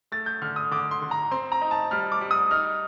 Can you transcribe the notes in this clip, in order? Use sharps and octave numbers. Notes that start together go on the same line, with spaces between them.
A3 A6
G6
D3 F6
D#6
D3 D6
C6
D3
A#5
C4 C6
A#5
D#4
A5
G3 F6
D6
G3
D#6
D#4 F6